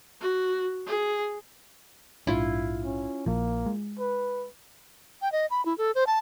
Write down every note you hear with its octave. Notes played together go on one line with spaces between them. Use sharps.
F#4
G#4
A#1 G#2 D4 E4 F4
C#4
A#1 F3 A#3
G#3
B4
G5
D#5
B5
E4
A4
C5
A5